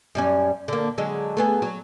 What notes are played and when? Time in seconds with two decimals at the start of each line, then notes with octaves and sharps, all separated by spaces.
0.15 F#2 G3 C#4
0.68 D3 A#3
0.98 D3 F#3 G#3
1.37 A3 B3 G#4
1.62 F#3